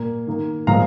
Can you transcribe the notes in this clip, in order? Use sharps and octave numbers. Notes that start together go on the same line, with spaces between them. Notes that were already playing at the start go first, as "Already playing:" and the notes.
Already playing: A#2 A#3
D#3 A#3
A#2 F3 G#3 C4 F5 A#5